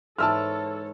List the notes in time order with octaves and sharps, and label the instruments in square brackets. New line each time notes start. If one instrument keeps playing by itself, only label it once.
[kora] G#2 E3 D5 [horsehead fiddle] A4 C#5 [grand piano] A5 E6 F6